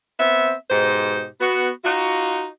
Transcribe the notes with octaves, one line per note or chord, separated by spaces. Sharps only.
B3 C4 E5
G#2 B2 D#4 G4 C5
B3 F#4
D#4 F4 F#4